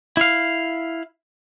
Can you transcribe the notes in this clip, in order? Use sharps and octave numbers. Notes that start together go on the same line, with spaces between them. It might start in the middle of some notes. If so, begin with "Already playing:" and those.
E4 F5